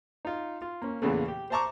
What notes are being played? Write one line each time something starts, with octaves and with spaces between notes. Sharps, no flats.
D#4 F4
F4
A#3 C#4
E2 A#2 C#3 E3 A3
G4
C5 E5 A5 A#5 C#6 D6